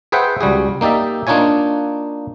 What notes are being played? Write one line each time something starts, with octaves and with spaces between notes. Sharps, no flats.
G#4 B4 C5 E5 F#5 G5
C#2 G3 F#4 G#4
A#3 D#4 G4 D5 E5
A#3 D4 D#4 F4 C#5 G#5